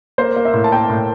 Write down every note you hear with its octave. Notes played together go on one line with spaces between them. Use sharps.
A#3 C5
A#3
E5
A2
A5
A#3 G5
A2